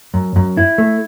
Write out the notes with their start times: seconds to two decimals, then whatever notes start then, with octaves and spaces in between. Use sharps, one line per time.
0.14 F#2
0.36 F#2
0.57 E4
0.78 A3